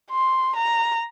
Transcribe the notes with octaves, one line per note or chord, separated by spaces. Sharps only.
C6
A#5